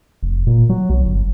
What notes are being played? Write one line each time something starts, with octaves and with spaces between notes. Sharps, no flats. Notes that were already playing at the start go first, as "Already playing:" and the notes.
F1
A#2
F#3
B1
G1